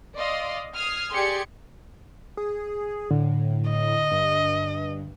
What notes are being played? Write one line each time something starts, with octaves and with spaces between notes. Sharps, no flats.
D5 D#5 F5 C6
D#6 F6 G#6 C7
G4 G#4 D5 C6 G#6 C#7
G#4
A2 D3
D#5
G2